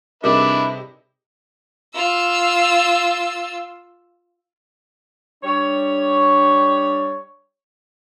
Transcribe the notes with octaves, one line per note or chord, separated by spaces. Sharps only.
C3 G3 D4 D#4 G#4 A#4 B4 E5
F4 E6
G3 D4 C#5